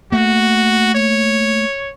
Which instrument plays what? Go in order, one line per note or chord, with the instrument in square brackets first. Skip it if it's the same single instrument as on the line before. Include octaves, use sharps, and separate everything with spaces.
[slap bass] A3 A#3 [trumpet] F#4
[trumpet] C#5